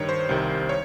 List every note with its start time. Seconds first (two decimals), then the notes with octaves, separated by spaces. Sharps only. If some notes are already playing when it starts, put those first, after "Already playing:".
Already playing: G2 D#3 C#5
0.09 C5
0.29 C2 C3 D#3
0.69 C#5